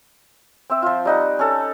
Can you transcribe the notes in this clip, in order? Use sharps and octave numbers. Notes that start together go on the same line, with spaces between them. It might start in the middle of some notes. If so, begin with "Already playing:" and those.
C4 E5
F3 F4
G3 D#4 F#5
C#4 A4